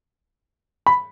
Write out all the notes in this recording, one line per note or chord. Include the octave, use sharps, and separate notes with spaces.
B5